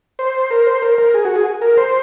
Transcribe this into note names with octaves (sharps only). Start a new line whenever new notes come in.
C5
A#4
C5
A#4
A#4
G#4
F#4
G#4
A#4
C5